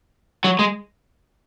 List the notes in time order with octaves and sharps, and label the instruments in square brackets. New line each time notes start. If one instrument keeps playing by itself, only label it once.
[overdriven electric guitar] F#3
G#3